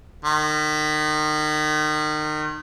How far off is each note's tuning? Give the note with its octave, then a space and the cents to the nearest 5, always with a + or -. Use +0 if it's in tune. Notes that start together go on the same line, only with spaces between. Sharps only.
D#3 -30